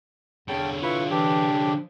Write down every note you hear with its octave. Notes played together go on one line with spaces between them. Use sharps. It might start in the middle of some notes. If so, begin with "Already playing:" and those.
E2 D3 C#4 G5 A5
E4 F4 B4 C#6
E3 D4 G4
F3